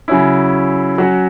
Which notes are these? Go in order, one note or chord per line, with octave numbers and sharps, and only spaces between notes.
C#3 F#3 C#4 E4
F#3 C#4 F#4